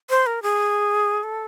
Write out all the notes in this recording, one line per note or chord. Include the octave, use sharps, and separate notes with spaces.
C5
A#4
G#4
A4